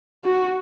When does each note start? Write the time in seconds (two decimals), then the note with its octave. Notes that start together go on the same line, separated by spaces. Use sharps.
0.24 F#4